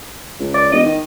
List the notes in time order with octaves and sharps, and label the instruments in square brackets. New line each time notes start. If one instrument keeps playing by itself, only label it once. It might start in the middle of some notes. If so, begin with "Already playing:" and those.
[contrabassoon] C#2
[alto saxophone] D5
[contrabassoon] E1 [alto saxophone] D#5
[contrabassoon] D#3